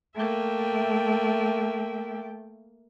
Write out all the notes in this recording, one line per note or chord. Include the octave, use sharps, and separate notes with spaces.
A3 A#3 E5 G5